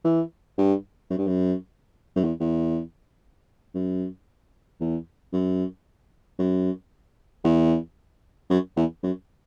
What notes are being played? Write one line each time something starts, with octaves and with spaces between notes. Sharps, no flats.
E3
G2
F#2
G2
F#2
F#2
E2
E2
F#2
E2
F#2
F#2
E2
F#2
E2
F#2